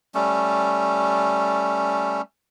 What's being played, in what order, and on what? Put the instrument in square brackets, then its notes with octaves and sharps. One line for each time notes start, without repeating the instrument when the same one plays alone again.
[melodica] G3 A3 C#4